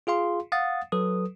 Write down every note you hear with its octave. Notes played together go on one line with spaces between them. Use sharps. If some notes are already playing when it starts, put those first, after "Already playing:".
F4 G#4 F5 C6
F5 F#5 D#6 A6
F#3 A4 B4 D#6